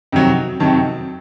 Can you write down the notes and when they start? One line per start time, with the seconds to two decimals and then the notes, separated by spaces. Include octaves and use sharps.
0.12 F2 C3 D#3 F#3
0.60 F2 C3 D#3 F#3 A5